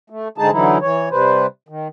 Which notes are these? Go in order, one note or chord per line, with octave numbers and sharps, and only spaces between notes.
A3
G#2 D3 G#3 D#4 G#4 A5
D3 E3 F#3 D#4 E4
E3 C#5
C3 G3 B4 C5
D#3